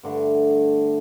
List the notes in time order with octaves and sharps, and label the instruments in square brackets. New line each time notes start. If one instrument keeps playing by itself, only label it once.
[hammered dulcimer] G2 D3 A3